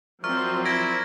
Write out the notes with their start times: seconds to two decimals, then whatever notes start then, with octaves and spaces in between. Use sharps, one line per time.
0.24 F3 F#3 C4 A#4 D5 E5 C#6 F6
0.65 E4 G#6 A#6 D7